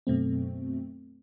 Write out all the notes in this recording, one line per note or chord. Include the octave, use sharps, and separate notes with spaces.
F#2 B2 A3 C4